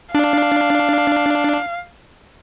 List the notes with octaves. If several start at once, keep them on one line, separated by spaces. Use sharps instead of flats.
D4 F5